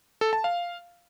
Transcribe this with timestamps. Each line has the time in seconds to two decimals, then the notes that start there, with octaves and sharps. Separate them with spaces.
0.21 A4
0.33 A5
0.44 F5